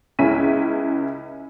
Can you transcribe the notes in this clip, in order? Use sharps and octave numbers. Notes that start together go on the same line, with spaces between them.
C#2 C#4 E4 B6 D#7